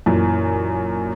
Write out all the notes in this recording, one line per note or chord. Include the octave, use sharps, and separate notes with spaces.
F#2 A#2 E3